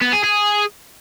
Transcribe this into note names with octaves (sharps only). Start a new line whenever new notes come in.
B3
G#4
G#4